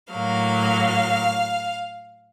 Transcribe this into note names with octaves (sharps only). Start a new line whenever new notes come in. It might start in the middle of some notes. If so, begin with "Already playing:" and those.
A2 F#3 A#3 F5